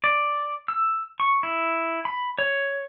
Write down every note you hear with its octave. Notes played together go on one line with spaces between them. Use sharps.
D5
E6
C#6
E4
B5
C#5